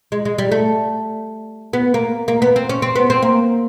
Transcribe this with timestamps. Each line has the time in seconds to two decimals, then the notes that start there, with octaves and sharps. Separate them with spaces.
0.12 G#3
0.25 G#3
0.38 G3
0.51 A3
1.73 B3
1.94 A#3
2.28 A#3
2.42 B3
2.56 C4
2.69 C#4
2.82 C4
2.96 B3
3.10 C4
3.22 A#3